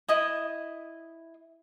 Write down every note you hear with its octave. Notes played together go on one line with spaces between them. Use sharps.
E4 D#5 D#6